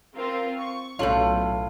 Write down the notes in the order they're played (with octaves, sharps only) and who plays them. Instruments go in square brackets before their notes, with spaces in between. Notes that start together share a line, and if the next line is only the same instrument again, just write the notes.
[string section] C4 F4 A#4
C#6
[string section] B1 [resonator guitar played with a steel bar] A2 F4 [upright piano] C#4 A4 F#7